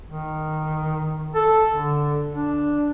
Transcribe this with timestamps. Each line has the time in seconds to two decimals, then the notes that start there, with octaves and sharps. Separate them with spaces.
0.10 D#3
1.34 A4
1.72 D3
2.33 D4